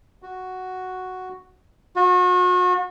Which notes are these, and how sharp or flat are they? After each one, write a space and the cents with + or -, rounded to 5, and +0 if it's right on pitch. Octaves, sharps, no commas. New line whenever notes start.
F#4 +0
F#4 -35